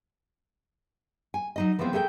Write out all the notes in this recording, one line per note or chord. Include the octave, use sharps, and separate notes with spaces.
G#5
F#3 D#4 D#5
E3 F3 G#3 B3 C4
A3 G#4 A#4 E5 G5